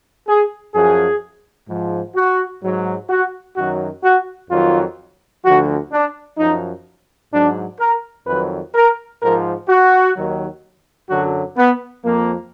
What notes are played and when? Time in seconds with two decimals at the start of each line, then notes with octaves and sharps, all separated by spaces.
0.28 G#4
0.74 F#2 F3 G#4
1.69 G#2 F3
2.15 F#4
2.63 G#2 F#3
3.10 F#4
3.56 F#2 D#3 F#3 F#4
4.04 F#4
4.50 F2 D#3 F#3 F4
5.45 D2 D3 F3 F#4
5.92 D4
6.39 F#2 F3 D#4
7.33 G#2 F#3 D4
7.80 A#4
8.27 F2 D#3 F#3 B4
8.75 A#4
9.21 G#2 F3 A#4
9.69 F#4
10.15 D#2 D#3 F#3
11.10 F#2 D3 F#3 F#4
11.57 B3
12.04 F2 F3 A#3